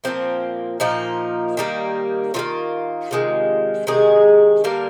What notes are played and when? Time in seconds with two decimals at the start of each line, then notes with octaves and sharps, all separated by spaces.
0.04 A#2 F3 A#3 C4
0.80 A#2 F3 A#3 D#4
1.57 D#3 G3 A#3
2.34 D#3 G3 A#3 F4
3.11 C3 D#3 G#3
3.87 C3 D#3 G#3 G#4
4.64 D3 G3 A#3 A#4